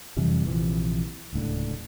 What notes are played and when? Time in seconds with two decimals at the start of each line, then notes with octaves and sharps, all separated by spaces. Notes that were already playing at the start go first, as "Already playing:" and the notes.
0.17 F2 C3 E3 G3
0.46 A#1 C3 E3 F3
1.33 D1 C#2 A2 D3